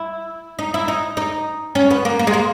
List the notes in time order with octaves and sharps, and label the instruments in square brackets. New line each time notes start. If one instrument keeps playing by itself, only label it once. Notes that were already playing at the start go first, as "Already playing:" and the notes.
Already playing: [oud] E4
D#4
E4
D#4
D#4
C#4
B3
A#3
A#3
G#3
A#3